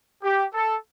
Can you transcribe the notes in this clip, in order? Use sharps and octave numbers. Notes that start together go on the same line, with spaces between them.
G4
A4